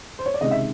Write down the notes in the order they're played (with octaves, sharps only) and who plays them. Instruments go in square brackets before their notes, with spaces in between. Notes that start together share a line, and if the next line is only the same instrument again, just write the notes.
[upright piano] C5
C#5
D5
C#2 C3 D#3 G#3 D#5
E5